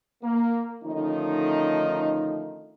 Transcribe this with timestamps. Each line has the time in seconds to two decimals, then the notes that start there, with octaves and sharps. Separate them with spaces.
0.24 A#3
0.83 D3 D#3 F3 A3 C#4 D#4